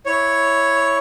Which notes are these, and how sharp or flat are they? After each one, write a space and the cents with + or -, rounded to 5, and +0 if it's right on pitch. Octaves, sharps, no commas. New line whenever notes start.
E4 +0 C#5 +0